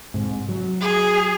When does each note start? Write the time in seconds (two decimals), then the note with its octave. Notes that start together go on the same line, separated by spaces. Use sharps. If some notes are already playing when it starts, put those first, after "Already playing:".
0.14 G#2 C3
0.49 F#3
0.81 G#4